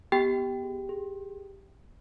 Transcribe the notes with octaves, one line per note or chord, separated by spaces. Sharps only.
B3 G4 G5
B3
G#4
G#4